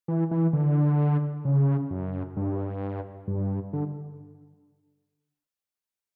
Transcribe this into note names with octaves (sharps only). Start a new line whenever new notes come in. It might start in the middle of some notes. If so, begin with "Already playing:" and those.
E3
E3
D3
C#3
F#2
G2
G2
D3